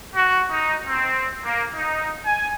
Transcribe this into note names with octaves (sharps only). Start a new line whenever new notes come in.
F#4
D#4
C4
A#3
D#4
G#5